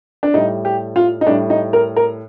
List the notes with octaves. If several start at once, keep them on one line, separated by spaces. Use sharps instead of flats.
D4
A2 G3 D#4
G4
F4
D#4
A2 G3 D4
D#4
A#4
A#4